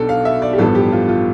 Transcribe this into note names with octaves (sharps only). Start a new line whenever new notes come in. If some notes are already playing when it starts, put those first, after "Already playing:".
Already playing: B1 B2 B3 D4 A4
F5
E5
D5
G4
A1 G2 F3 B3 A4
G4
F4
F4